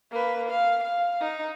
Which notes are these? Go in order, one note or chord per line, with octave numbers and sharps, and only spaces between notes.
A#3 B4
F5
F5
D#4